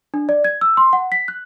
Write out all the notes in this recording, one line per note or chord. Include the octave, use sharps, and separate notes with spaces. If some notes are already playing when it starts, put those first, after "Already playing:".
D4
D5
G#6
E6
C6
F#5
B6
F#6